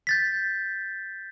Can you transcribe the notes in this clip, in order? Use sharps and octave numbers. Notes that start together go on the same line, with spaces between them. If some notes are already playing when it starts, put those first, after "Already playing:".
G6 A6 B6